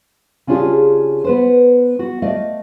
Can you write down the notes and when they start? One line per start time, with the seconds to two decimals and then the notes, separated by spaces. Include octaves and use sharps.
0.47 C#3 C#4 D4 F4 G4 G#4
1.24 B3 B4 C5
1.99 F#4
2.22 A3 D5 D#5 F5